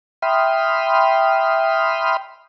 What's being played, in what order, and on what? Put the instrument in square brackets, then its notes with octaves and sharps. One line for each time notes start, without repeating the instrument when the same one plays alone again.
[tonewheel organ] E5 G5 B5 C6 D#6 F6